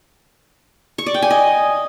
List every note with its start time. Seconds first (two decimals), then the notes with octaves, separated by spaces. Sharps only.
0.98 C#6
1.06 D5
1.14 G5
1.22 G#5
1.30 D#5